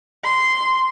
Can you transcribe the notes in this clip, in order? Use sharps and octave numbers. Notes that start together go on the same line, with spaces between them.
C6